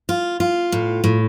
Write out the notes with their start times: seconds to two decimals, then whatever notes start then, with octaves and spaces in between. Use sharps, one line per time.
0.09 F4
0.40 F4
0.72 A2
1.04 A2